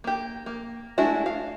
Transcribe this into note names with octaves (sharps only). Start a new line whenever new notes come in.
A#3 G4
A#3
G#3 A3 D4 E4 F#4
F5